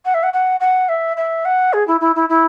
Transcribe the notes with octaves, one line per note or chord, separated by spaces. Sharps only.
F#5
E5
F#5
F#5
F#5
E5
E5
F#5
G#4
E4
E4
E4
E4